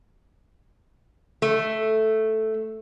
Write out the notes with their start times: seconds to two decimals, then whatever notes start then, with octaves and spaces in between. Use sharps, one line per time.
1.42 A3